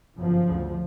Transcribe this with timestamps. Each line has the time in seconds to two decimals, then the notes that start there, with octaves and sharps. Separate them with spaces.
0.18 G1 F#2 C#3 F3
0.48 D2 C#3